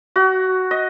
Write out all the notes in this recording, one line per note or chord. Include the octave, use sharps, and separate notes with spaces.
F#4
D#5